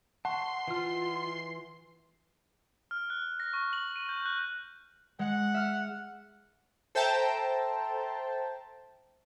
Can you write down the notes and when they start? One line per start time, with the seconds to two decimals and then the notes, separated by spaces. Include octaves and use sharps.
0.25 F#5 A5 C6 C#6
0.68 E3 F4 F6
2.91 F6
3.10 F#6
3.40 A#6
3.53 C#6
3.73 F#7
3.96 D#7
4.09 G6
4.26 F#6
5.19 G#3 F#5
5.54 E5 F6
6.95 A4 C5 E5 G5 A5 A#5